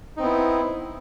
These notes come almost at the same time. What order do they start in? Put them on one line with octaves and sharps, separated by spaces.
D#4 C4 B3 E4